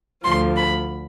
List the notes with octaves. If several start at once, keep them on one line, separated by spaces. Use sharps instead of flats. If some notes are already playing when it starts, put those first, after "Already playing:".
D2 D3 F3 C6
B5